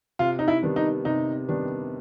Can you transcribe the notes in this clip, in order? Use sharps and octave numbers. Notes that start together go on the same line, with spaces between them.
C3 F4
D#4
E4
D#3 G3 B3 D4
D#4
C3 D#4
D#3 G3 B3 D4